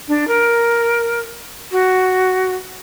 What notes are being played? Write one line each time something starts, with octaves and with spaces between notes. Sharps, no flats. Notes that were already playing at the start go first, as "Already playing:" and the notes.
D4
A#4
F#4